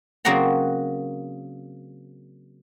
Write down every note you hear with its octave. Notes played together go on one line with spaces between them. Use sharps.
C#3 F#3 A#3 C4 F#5 A#5